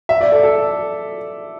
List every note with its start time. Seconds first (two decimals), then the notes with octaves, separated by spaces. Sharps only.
0.09 E5
0.21 D5
0.32 A4
0.43 A4